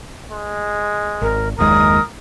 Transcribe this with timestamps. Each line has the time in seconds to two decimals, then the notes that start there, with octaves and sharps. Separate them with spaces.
0.31 G#3
1.22 G#1 A#4
1.58 F#1 D#2 G#3 A#4 D#6